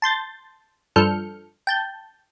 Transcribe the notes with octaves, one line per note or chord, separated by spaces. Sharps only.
A5 C6 G6 A6
G2 F3 A4 F6 G6 C#7
G5 A5 G6